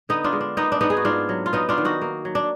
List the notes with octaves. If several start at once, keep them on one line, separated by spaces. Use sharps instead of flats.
D3 B3 D#4
D4 F4
G#3
D4
A#3 B3 D#4
D4
G#2 B3 D#4
G#4
F#4
G#2 D4 F4
F#3
F4
F#3 B3 D#4
D4 F4
D#3
D#4 F#4
A#3
F#3
D4